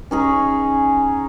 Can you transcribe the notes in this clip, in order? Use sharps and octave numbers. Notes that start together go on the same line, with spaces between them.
C#4 D#4 G#4